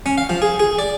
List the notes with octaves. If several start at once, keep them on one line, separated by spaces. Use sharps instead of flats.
C#4
F5
F3
G#4
G#4
D5